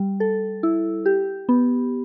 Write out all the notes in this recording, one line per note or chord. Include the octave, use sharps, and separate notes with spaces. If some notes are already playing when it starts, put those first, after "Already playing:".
Already playing: G3
A4
E4
G4
B3